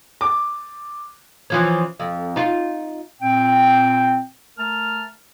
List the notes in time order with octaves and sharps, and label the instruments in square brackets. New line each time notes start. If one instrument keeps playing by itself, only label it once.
[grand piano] D6
[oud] E3 F3 C#4
F2
D#4 F4
[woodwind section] A#2 C4 G5
A3 A#4 A5 F6